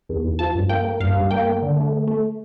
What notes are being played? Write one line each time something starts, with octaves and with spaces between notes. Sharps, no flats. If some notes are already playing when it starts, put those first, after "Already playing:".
E2
E2
F3 A5
G2
A#3 G5
A#3
G2 F5
G2
A#3 G5
A#3
D3
A3
A3
A3